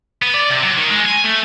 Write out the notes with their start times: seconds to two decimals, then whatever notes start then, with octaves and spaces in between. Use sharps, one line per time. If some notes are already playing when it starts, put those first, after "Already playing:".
0.22 B3
0.34 D5
0.50 C3
0.63 F#3
0.77 D#3
0.90 G#3
1.05 G#5
1.24 A3